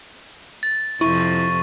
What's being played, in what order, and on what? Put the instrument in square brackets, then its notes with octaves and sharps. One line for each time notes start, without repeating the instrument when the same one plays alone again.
[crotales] A6
[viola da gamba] F2 C3 [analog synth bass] E4 [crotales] C#6